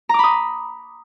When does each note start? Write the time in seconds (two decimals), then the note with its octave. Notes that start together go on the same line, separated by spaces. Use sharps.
0.09 A#5
0.14 D6
0.19 B5
0.24 D#6